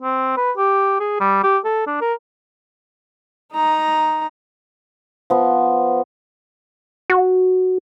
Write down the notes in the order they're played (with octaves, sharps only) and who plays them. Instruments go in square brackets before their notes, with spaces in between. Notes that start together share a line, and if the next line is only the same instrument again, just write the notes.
[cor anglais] C4
B4
G4
G#4
G3
G4
A4
D4
A#4
[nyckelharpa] D#4 A#5
[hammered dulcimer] F3 B3
[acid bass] F#4